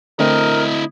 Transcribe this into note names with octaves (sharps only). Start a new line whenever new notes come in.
D3 A3 C4 E4 A#4 D#5